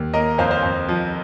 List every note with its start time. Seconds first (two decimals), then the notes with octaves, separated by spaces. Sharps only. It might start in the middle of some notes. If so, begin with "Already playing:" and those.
Already playing: D#2
0.13 A#3 A#4 D#5
0.38 F2 C5 F5
0.51 C5 F5
0.63 F2
0.88 F3